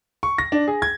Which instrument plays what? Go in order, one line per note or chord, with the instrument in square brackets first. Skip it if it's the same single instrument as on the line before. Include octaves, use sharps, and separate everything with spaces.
[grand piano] C#6
A#6
D4
G#4
G#6